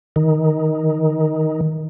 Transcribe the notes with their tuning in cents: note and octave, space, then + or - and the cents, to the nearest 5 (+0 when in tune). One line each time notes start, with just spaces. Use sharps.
D#3 +10